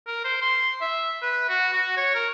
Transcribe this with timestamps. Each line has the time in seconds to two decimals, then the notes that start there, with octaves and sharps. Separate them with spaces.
0.07 A#4
0.24 C5
0.42 C6
0.81 E5
1.22 B4
1.49 F#4
1.73 F#4
1.97 C#5
2.15 A#4